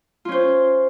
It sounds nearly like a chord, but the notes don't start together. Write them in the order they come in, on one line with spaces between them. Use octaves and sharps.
F4 C#4 C5